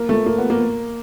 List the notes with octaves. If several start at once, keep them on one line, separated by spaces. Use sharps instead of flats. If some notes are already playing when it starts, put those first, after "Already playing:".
Already playing: A#3
A3
A#3
B3
A#3